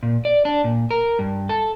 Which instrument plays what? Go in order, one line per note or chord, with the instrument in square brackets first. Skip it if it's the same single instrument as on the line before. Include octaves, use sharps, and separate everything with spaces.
[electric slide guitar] A#2
D5
D4
A#2
A#4
G2
A4